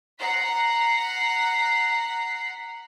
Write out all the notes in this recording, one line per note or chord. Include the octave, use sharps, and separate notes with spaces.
F#5 A#5 B6 C7